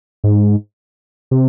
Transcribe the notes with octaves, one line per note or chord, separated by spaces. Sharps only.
G#2
C3